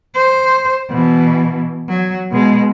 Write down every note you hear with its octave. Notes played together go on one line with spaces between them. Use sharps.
C5
B2 E3
F#3
B2 G#3